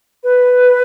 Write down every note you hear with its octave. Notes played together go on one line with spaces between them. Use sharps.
B4